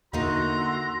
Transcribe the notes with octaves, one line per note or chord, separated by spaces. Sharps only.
E2 D3 A#3 D#4 E4 F#4 A#5 C6